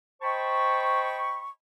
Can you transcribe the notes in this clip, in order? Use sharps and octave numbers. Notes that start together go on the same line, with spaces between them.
C5 D#5 G5 A5 B5 C#6